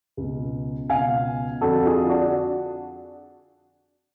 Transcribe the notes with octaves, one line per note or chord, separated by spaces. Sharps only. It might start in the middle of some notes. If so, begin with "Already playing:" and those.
C#2 B2
C#2 B2 F5 G#5
F2 D3 F#4 A4
F4 G#4
D4 F#4